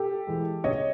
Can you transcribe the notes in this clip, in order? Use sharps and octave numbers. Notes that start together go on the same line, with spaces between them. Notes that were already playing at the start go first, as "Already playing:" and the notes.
Already playing: G4 A4
E3 G#3
C#3 C#5 D#5